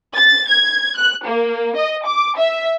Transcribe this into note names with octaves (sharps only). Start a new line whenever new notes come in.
A6
G#6
F#6
A#3
D#5
D6
E5